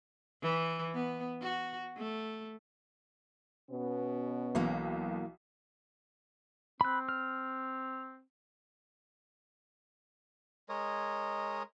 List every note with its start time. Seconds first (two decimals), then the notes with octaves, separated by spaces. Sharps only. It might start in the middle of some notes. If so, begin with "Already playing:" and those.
0.42 E3
0.94 B3
1.42 F#4
1.97 A3
3.70 B2 B3 C#4
4.55 B1 E3 F#3 A#3
6.81 C4 B5 F#6
7.09 F6
10.69 G#3 A#4 C#5 D#5